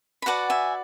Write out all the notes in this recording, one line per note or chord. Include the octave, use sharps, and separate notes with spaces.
B5
F#4 B4 D5 F#5 A5
E5 G#5